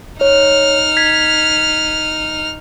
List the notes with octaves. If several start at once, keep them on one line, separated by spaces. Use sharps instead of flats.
D#4 C#5 F6
G#6 B6